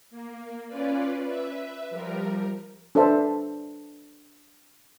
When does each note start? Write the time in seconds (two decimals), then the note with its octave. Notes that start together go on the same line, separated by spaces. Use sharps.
0.11 A#3
0.67 C#4 F4 B4 D5
1.22 B4 E5
1.90 F3 G3 A#4
2.95 D4 A4 B4 C5 E5 A5